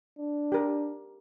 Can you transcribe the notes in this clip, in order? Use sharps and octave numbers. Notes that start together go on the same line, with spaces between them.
D4
G4 A#4